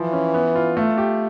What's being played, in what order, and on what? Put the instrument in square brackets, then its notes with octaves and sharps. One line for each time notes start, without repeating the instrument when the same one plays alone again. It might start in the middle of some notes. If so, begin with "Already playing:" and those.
Already playing: [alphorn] E3 [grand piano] F3
[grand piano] C#4
B3
F4
A3
G4